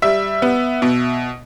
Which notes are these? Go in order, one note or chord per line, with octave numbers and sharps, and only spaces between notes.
G3 E5
B3
B2